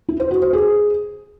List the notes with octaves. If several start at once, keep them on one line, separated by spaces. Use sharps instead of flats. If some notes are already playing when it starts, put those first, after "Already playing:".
E4
C5
F#4
C5
G#4